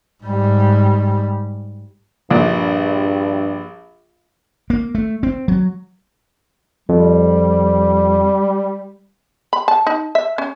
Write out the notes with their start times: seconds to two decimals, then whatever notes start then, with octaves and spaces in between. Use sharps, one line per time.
0.24 G#2 G3
2.30 A#1 G2 A#2
4.70 A#3
4.95 A3
5.23 C4
5.48 F#3
6.89 F2 G3
9.53 B5
9.68 A5
9.87 D#4
10.15 E5
10.38 C#4